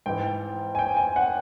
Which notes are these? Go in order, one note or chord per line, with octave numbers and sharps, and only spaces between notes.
G#2 E3 G5
G#5
G5
G#5
F#5